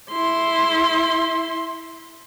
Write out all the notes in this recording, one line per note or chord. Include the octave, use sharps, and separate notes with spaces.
E4 C6